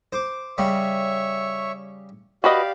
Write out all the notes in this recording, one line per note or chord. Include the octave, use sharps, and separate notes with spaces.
C5 D6
C#3 G3 C#5 E5 B5 C#6
F#4 G4 B4 D5 D#5 F5